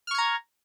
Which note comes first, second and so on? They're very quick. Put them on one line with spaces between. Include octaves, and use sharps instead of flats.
F6 C#6 G#6 A#5